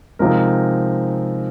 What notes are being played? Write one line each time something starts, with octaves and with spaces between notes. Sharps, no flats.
C3 F3 G#3 D#4 A#4